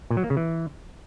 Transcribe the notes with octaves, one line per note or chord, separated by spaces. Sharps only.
A#2
F#3
A#3
C#3
E3